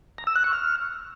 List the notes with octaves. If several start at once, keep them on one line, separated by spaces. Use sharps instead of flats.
A#5
E6
F#6
C#6
F6